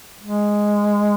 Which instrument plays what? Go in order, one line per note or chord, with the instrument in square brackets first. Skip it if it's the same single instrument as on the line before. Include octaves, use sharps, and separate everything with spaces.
[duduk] G#3